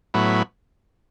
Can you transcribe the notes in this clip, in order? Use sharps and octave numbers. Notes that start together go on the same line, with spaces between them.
A2 F#3 B3 E4